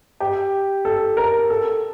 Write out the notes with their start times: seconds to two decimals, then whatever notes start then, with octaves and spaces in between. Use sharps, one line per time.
0.20 G4
0.85 A4
1.17 A#4
1.50 A4